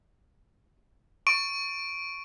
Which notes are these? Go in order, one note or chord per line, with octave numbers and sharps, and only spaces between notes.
C#6 D7